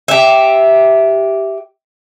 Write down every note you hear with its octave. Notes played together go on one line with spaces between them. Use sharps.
G4 E5